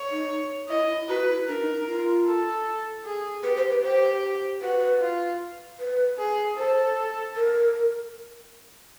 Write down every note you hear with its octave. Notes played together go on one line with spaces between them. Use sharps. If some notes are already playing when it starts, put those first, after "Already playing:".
Already playing: C#5
D#4
E4 D#5
F#4 B4
E4
D4 A#4
D#4
F4
A4
G#4
G4 B4
C5
B4
G4 C5
F#4 B4
F4
B4
G#4
A4 C5
A#4